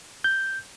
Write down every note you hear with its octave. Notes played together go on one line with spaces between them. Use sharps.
G6